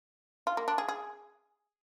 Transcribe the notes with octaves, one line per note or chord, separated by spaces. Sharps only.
F4
A#3
D4
G#4
G#4